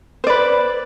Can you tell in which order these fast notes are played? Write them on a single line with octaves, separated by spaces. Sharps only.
C5 D5 B4